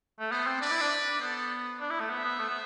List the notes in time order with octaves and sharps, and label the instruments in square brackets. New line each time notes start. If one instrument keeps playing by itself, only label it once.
[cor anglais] A3
[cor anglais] B3 [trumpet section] A4 C5
[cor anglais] C4
[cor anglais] D4 [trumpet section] B4 D5
[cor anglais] E4
D4
D4
[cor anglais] B3 [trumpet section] A4 C5
[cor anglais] D4
E4
A3
[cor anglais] B3 [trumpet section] C5 E5
[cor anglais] B3
A3
B3